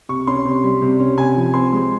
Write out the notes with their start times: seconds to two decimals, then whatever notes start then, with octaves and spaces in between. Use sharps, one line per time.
0.09 C3 C#6
0.27 C#4 C6
0.45 C3
0.64 G3
0.82 C3
1.00 C#4
1.17 C3 G#5
1.36 F3
1.54 C4 C6
1.73 G#3